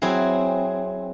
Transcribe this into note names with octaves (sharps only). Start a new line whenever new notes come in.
F#3 C4 E4 G#4